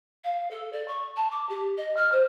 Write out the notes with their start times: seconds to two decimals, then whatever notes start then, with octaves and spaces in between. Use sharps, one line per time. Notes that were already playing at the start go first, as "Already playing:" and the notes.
0.24 F5
0.51 A4
0.73 D5
0.88 C#6
1.16 A5
1.31 D6
1.49 G4
1.77 D#5
1.96 F6
2.12 C5